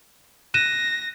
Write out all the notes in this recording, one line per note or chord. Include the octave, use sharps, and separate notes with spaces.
F#6 A#6 D#7 E7